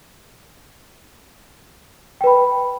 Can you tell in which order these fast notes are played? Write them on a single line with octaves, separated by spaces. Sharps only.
G5 B4 B5